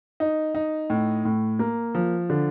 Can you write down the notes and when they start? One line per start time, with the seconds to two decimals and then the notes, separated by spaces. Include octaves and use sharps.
0.20 D#4
0.55 D#4
0.90 A2
1.25 A2
1.59 A#3
1.95 F3
2.30 D3